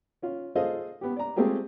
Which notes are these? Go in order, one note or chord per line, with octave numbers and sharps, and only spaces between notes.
C#4 F4
F4 G#4 A4 C5 D#5 F5
B3 G4
D5 A#5
G#3 A3 C4 F4 G4 G#4